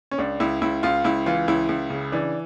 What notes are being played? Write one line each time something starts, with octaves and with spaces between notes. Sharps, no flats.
C#4
C#2 D4
C#2 E4
C#2 E4
C#2 F4
C#2 E4
E3 F4
C#2 E4
C#2
C#3
E3 D4